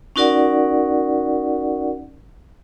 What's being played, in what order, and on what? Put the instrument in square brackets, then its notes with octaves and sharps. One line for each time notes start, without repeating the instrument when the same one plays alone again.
[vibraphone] C#4 D#4 F#4 A#4 D5 F#5